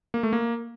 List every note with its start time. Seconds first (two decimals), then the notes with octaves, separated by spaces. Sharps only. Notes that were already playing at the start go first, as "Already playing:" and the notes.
0.14 A#3
0.23 A3
0.33 A#3